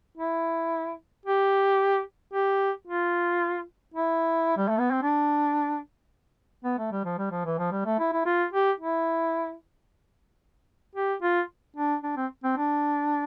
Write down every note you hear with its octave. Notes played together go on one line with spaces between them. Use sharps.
E4
G4
G4
F4
E4
G3
A3
B3
C4
D4
B3
A3
G3
F3
G3
F3
E3
F3
G3
A3
E4
E4
F4
G4
E4
G4
F4
D4
D4
C4
C4
D4